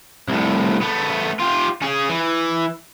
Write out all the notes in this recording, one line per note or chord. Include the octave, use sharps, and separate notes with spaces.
C2 A2
A3 B3
F4 G4
C#4 G#4
E3